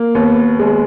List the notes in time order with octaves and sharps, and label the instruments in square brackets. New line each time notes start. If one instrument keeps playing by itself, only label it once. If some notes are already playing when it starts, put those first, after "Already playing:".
Already playing: [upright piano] A#3
[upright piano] D#2 [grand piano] B3
[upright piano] D#2 [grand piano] G#3